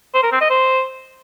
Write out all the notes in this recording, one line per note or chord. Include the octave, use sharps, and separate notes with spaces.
C5
A#4
C4
D#5
C5